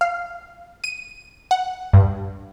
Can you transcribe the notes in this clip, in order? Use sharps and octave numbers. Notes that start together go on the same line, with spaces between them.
F5
D#7
F#5
G2